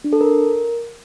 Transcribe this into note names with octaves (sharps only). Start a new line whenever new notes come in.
D4
A4
A#4